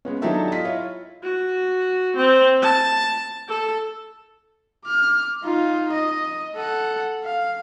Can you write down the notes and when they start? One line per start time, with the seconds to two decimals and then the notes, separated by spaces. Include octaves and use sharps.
0.05 G#3 B3 C#4
0.22 F#3 D4 D#4 G4 A4 E5
0.52 F4 D#5 B6
0.64 E4 F4 C#5
1.23 F#4
2.16 C4
2.62 A5
3.48 A4
4.85 D6 F6
5.43 D#4 F4
5.92 D#5
6.55 A4 F#5
7.24 F5